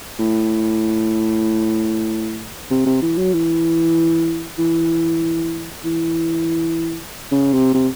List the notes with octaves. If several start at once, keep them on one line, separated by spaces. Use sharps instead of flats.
A2
C3
C3
E3
F#3
E3
E3
E3
C#3
C3
C3